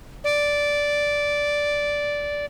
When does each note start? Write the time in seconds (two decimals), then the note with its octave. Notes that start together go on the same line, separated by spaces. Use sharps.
0.24 D5